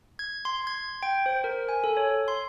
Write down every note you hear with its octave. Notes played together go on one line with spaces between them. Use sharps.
G#6
C6
G#6
G5
C5
A#4
G#5
A4
C#5
C6